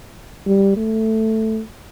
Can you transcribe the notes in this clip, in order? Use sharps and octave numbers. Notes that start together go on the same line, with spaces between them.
G3
A3